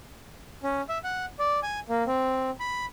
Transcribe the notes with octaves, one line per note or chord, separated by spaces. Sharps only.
C#4
E5
F#5
D5
G#5
A#3
C4
B5